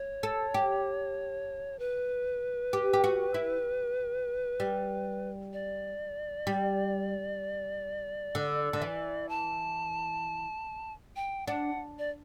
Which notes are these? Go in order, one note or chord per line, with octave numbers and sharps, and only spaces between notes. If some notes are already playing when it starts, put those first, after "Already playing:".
Already playing: C#5
A4
G4
B4
G4
G4
F#4
E4
G3
D5
G3
D3
D3
E3
A5
G5
D4 F#5
D5